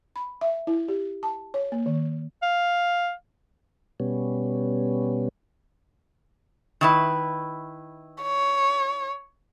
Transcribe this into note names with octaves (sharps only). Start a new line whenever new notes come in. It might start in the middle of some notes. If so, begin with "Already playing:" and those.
B5
E5
E4
G4
A5
C#5
A#3
D#3
F5
B2 G3 B3 C#4
D#3 E4 B4
C#5